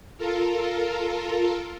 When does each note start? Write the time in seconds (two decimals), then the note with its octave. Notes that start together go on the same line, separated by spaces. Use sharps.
0.18 F4 A4 A#4